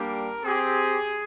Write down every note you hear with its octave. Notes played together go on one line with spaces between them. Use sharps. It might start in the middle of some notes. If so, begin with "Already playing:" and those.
Already playing: G3 A#3 D4 G4 A#4
C4 G4 G#4